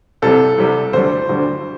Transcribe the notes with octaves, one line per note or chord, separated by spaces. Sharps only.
C2 C3 G3 A4
C2 C3 G3
D2 D3 G3 C5
D2 D3 G3